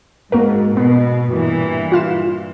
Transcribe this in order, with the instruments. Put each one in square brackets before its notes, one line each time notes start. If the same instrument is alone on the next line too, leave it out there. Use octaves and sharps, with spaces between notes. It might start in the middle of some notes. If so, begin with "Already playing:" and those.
[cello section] G#2 [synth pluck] A#3 F#4 A#4
[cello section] B2 [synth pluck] B3
[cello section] G2 A#2 E3
[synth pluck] F4 F5 E7